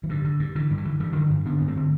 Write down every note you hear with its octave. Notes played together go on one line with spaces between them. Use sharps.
E3
G2 D3
D3
G2
D3 E3
G2
E3
D3
G2 E3 G3
D3
G2
D3 B3 D4
G2 B3
A3 C4
D3